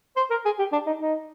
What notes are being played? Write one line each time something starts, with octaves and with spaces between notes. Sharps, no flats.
C5
A#4
G#4
G4
D4
D#4
D#4